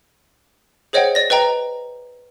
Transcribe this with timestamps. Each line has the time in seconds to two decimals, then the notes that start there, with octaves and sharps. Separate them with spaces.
0.93 G#4 C5 C#5 D#5 F#5 G5
1.15 D5 A6 A#6
1.30 B4 D#5 G5 A#5